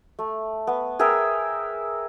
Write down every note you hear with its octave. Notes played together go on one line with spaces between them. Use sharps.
A3
B3
G#4 A#4 E5 G5